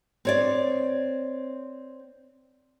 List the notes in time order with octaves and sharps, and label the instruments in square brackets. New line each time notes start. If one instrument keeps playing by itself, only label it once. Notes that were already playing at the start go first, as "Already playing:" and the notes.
[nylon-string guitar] C4 C#5 D5